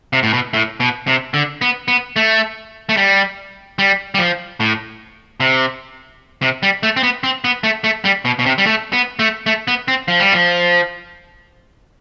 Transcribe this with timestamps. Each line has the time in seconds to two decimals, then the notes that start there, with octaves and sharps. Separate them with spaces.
0.13 C3
0.23 A2
0.33 B2
0.54 A2
0.80 B2
1.07 C3
1.34 D3
1.62 B3
1.88 B3
2.16 A3
2.89 A3
2.97 G3
3.79 G3
4.15 G3
4.19 F3
4.60 A2
5.40 C3
6.42 C3
6.63 G3
6.83 A3
6.97 C4
7.03 B3
7.24 C4
7.44 B3
7.64 A3
7.84 A3
8.05 G3
8.25 B2
8.39 B2
8.46 C3
8.58 G3
8.66 A3
8.93 B3
9.19 A3
9.46 A3
9.68 B3
9.88 C4
10.08 F3
10.20 G3
10.33 F3